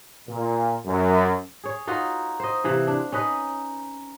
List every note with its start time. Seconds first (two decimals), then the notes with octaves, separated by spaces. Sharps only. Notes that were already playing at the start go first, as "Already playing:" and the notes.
0.29 A#2
0.86 F#2
1.64 G#4 C#5
1.87 D#4 F4 F#4 B4
2.40 C5 D#5
2.64 C3 E3 F5
2.87 D4
3.12 C#4 D#4 B4 D#5